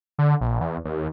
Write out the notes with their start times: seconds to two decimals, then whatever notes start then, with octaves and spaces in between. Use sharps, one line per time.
0.19 D3
0.41 A#1
0.61 E2
0.85 D#2